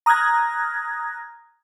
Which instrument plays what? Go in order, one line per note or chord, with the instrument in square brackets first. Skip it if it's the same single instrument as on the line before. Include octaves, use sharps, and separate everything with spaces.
[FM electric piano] A#5 D#6 F6 F#6 G#6 A#6